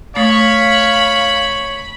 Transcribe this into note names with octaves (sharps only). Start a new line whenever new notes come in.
A3 C#5 F5 B5 D#6 A6